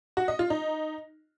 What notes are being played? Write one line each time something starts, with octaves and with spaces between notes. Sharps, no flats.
F#4
D#5
F4
D#4